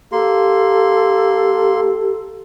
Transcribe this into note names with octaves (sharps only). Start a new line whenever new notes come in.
A#3 G4 A4 C6